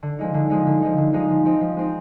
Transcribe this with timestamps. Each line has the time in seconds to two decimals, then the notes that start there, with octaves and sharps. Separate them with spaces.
0.03 D3
0.19 F3 G#3 D#4
0.34 D3
0.50 F3 G#3 D#4
0.67 D3
0.82 F3 G#3 D#4
0.98 D3
1.13 F3 G#3 D#4
1.29 F3
1.45 G#3 C4 D#4
1.61 F3
1.77 G#3 C4 D#4